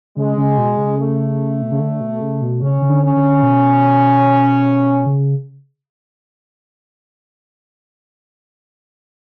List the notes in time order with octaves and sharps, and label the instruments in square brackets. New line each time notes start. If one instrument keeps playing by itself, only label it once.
[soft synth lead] C#3 [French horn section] G#3
[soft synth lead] C#3
B2
C#3
[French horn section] A3
[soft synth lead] B2
C#3
D3
B2
C#3
B2
[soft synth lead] C#3 [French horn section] C#4
[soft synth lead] C#3
D3
[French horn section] C#4
[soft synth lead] D3
B2
C#3